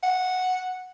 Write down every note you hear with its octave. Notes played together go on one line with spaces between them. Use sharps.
F#5